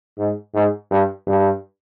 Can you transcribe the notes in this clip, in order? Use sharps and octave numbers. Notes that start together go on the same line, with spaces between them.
G#2
G#2
G2
G2